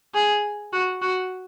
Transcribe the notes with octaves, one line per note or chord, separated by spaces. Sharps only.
G#4
F#4
F#4